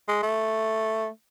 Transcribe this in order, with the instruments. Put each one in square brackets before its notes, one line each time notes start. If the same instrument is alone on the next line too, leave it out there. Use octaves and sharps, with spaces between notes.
[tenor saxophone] G#3
A3